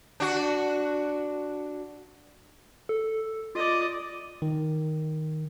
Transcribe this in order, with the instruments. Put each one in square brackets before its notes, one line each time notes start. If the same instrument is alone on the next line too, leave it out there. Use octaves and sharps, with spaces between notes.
[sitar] D4 F#4
[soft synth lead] A4
[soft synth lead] F4 [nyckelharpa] D5 D#5
[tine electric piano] D#3